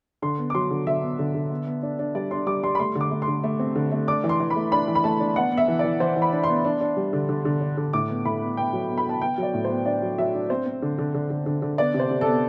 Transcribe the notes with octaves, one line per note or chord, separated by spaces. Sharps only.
D3 C6
B3
D6
F#3 C6
D3
D3 E5
B3
D3
D3
B3
B3
D4
D4
G3 D5
D4 C6
G3 D6
G3 C6
B5
A3 C6
D3
D6
A3
C6
D3
A3
C4
D3
A3
D4 D6
E3
C6
E3
B5
A3
D4 B5
E3
B5
A3 A5
D4
B3 F#5
B3
E5
E3
E3 D5
E3 C5
E3
B5
D4
B3 C6
D4
D4
G3
D3
D3
D3
D4
D3
A2 D6
B3
A2 B5
B3
B3 G5
F#3
B3
B5
B3 A5
B3 G5
F#3 D5
A2
C5
B3
D4 D5
F#3
F#3 E5
D4
C4 C5
C4
D3
D3
D3
D3
D3
D3
B3 D5
C3
C5
C3
A4
B3